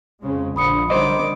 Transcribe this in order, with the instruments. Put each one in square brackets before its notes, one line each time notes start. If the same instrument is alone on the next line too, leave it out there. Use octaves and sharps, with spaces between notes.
[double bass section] F2 C#3 G#3
[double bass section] A#1 D3 F3 [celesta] B5 D#6 C#7
[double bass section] D3 D#3 G3 [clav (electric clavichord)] C5 D#5 [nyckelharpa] D6